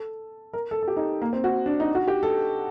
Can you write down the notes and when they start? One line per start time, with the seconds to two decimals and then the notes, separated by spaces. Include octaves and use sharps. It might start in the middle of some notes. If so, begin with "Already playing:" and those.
Already playing: A4
0.53 A#4
0.71 A4
0.83 A4
0.88 G4
0.97 D#4
1.22 A#3
1.33 C4
1.44 F#4
1.66 D4
1.80 D#4
1.95 F#4
2.08 G4
2.23 A4